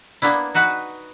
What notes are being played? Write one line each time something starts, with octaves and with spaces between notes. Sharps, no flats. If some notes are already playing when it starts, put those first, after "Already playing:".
A#3 B3 D4 E4
D#4 F#4 B4 F#5